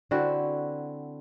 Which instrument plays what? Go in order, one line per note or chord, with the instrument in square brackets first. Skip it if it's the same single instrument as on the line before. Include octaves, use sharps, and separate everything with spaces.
[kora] D3 C4 E4 F#4